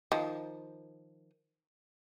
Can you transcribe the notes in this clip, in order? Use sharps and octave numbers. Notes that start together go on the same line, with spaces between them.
D#3 F3